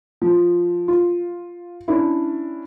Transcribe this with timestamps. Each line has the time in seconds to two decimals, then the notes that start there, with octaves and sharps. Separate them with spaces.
0.22 F3
0.88 F4
1.88 C#4 D4 E4